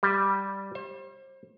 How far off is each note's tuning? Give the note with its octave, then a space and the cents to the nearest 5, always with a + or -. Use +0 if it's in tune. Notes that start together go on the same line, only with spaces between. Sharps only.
G3 +0
C5 +35